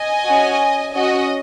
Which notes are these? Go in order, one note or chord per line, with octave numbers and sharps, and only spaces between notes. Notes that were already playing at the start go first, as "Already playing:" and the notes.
Already playing: D#5 G#5
C#4 F#4
C#4 F#4 D#5